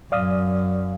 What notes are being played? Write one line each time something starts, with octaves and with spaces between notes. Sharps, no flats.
F#2 D5 F5 D#6